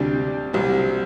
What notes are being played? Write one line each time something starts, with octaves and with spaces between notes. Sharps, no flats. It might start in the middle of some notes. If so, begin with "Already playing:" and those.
Already playing: D2 C3 G3 D4
C2 C3 F#3